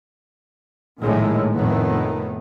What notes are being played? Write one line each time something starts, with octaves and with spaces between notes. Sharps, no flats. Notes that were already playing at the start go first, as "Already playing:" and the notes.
A#1 A2 D#3 G#3
F1 A2 D#3 B3